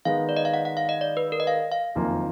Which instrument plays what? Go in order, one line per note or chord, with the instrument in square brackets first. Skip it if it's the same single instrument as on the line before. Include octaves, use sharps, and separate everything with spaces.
[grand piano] D#3 G#3 B3 [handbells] F5
[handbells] D5
D#5
F5
F#5
F#5
F5
D#5
D5
B4
A#4
D#5
F5
F5
[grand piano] F#1 F2 D#3 A#3 F4